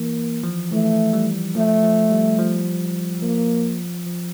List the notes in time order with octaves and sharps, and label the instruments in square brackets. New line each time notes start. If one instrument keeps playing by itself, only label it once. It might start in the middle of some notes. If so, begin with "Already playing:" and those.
Already playing: [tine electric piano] E3 [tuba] A#3
[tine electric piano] F3
[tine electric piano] E3 [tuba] A3
[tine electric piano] G3
[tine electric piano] F3 [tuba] A3
[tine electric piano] F3
G3
F3
[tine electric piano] F3 [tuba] A#3
[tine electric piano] F3